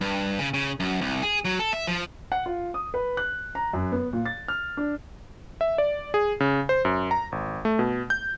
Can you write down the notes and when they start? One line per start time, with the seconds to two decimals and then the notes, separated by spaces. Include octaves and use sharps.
0.01 G2
0.39 C#3
0.54 C#3
0.80 F#2
1.01 C2
1.23 G#4
1.45 F#3
1.59 A4
1.73 E5
1.87 F3
2.32 F#5
2.46 F4
2.74 D#6
2.94 B4
3.17 F#6
3.55 A#5
3.73 F#2
3.92 B3
4.13 A#2
4.26 A6
4.48 F6
4.77 D4
5.61 E5
5.78 D5
6.14 G#4
6.40 C#3
6.69 C5
6.85 F#2
7.11 A#5
7.32 G#1
7.65 A3
7.79 B2
8.10 G6